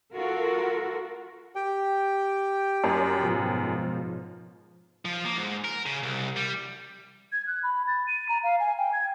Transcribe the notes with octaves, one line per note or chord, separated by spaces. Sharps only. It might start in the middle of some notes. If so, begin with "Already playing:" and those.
F4 F#4 A4 A#4
G4 G5
F#2
G#2 B2 F3
F3
A#3
G#2
A#4
C#3
C2
G3
G#6
F#6
B5
A6
D#7
A#5
F5
G#5
G5
G#6